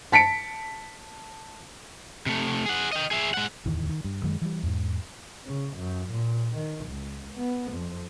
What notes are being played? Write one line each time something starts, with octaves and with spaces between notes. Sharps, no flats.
A5 B6 C#7 D7
C3 A3
G#4 F#5
D#5 G5
G#4 E5
G#3 F#5
D1 E2 D#3 E3
D#3
G2
F#2 D#3 G#3
E3 G3
E2 G#2
C#3
F#2
A#2
D#3
C#2
B3
F2